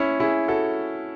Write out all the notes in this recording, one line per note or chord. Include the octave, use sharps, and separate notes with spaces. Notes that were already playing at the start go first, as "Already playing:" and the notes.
Already playing: C#4 E4
E4 G#4
F#4 A4